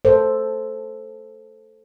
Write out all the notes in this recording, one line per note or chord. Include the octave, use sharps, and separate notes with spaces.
A4 C5